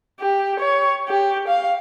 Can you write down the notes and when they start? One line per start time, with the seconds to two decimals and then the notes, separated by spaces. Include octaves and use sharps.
0.21 G4
0.59 C#5
1.08 G4
1.48 F5